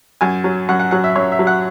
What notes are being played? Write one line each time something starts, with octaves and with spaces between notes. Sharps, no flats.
F#2 G#5
F#3
F#2 F#5
F#5
F#3 F#5
E5
F#2 C#5
E5
F#3
F#5